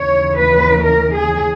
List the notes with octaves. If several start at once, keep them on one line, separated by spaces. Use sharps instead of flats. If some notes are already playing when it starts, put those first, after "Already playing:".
Already playing: D#2 C#3 E3 C#5
B4
A#4
G#4